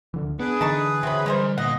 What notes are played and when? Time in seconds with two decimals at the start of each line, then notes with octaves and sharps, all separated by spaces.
0.14 D2 D3 E3
0.40 B3 D4 G#4 B4
0.61 D3 E3 D#4 A5 C#6
1.03 C#2 C3 F#3 B5
1.26 G3 G#3 A#4 C5
1.58 C2 A#2 D#5 F#5